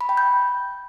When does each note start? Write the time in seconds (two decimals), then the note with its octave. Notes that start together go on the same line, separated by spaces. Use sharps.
0.01 B5
0.09 G5
0.17 G6